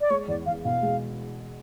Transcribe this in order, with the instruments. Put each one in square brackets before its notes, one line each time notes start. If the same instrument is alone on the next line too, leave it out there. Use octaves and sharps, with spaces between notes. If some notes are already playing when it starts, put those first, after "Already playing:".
[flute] D5
[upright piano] G#3 [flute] C#5
[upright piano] E2 [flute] D5
[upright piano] E2 [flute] F5
[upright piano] B2 [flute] F5
[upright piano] G#3